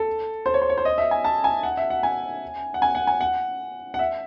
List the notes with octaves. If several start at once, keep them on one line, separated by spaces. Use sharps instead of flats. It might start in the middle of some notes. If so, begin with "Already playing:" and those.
Already playing: A4
C5
C#5
C5
C#5
C5
D#5
E5
G#5
A5
G#5
F#5
E5
F#5
G#5
F#5
G#5
F#5
G#5
F#5
F#5
E5